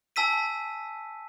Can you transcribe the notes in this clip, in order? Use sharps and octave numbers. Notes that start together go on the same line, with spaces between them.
G#5 A5 E6 B6 D#7